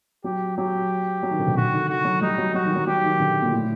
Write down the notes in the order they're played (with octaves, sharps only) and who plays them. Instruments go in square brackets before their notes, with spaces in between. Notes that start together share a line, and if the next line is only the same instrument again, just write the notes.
[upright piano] F#3 [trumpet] G4
[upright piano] F#3 [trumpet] G4
[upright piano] F#3
D#3
D3
C3
[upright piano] D3 [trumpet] F#4
[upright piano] D#3
[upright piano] D#3 [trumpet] F#4
[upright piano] F#3
[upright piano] G3 [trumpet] D#4
[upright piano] F#3
[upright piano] F#3 [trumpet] F#4
[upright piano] D#3
F#3
[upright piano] F#3 [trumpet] G4
[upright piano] D#3
D3
A#2
A2